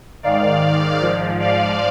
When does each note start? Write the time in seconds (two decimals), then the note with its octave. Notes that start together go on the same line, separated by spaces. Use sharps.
0.23 G#2 D#3 D5 F5
1.01 G#2 F3
1.40 D5 F5